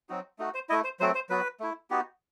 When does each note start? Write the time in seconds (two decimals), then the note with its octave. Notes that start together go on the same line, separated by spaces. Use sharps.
0.09 F#3 C4 D#4 F#4
0.39 A3 D#4 F#4
0.54 C5
0.69 A3 E4 D#5
0.84 C5
1.00 F#3 A3 C4 C5
1.15 C5
1.30 F#3 B3 F#4 B4
1.60 A3 E4
1.90 B3 D#4 F#4 G4